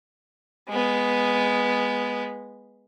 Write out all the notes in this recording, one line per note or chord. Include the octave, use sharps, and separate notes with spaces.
G#3 B3